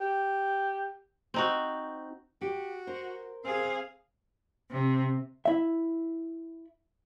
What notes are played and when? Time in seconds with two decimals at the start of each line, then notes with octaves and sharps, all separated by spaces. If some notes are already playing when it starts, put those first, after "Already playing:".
0.01 G4
1.34 C4 D#4 F#4
2.41 F#4 G4
2.87 A#4 C5
3.44 C4 G#4 F5
4.70 C3
5.45 E4 E5